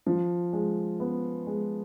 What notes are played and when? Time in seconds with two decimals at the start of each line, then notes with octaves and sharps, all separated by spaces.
0.06 F3
0.53 G#3
1.00 B3
1.47 G#3